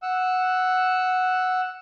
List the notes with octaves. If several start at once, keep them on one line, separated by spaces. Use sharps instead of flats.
F#5 E6